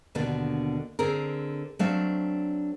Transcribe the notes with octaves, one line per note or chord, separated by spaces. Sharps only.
D#2 B2 D3 A#3 D4
D3 C4 G#4 A#4
F#3 A3 C4 D4 F5